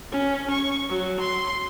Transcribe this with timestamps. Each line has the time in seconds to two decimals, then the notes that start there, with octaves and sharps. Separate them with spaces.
0.12 C#4
0.51 C#6
0.89 F#3
1.20 C6